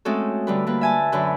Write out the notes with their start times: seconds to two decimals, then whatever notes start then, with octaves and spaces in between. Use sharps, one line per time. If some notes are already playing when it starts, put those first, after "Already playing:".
0.05 G#3 A3 C4 C#4 F#4 A4
0.47 D3 G3 B4
0.67 G3 A#3 B4
0.81 E5 G#5 A5
1.12 F#2 D3 B4